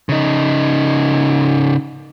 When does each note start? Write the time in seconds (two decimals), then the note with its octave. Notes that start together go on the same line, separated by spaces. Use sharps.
0.09 C#3 D#4